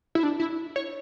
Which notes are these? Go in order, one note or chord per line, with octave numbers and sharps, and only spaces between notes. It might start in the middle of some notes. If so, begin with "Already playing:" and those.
E4
D4
E4
C#5